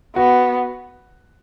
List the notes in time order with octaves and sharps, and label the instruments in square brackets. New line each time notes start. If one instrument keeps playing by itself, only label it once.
[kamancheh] B3 [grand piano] F#4